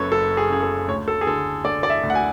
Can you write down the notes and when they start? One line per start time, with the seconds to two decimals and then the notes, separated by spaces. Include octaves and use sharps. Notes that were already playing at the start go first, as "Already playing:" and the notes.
Already playing: F#1 F#2 A4 B4 C#5
0.12 F#1 A4
0.37 G#4
0.50 C#3 G#4
0.63 A4
0.88 D2 C#5
1.08 A4
1.21 G#4
1.27 D3 A4
1.65 D3 D5
1.83 D5
1.90 E5
2.03 D2
2.10 F#5
2.15 G#5